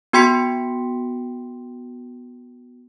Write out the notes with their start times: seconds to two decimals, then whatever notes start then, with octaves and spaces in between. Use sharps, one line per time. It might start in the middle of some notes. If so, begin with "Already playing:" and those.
0.13 B3 F#4 G5 C6 B6 C#7